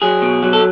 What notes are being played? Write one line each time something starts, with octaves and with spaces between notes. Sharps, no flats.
F#3 G#4
B2
F#3
A4